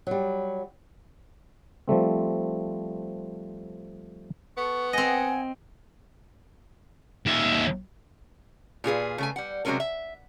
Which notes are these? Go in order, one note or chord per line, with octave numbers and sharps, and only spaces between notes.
F#3 G3
F3 G3 A3 C4
B3 A4 C#6
C4 D#5 F#5 G#5
D#2 E5
A#2 F4 G#4 B4
C#3 A3 G#5
G3 F#5
C3 F#3 G#3 A3 C#4 A#4
E5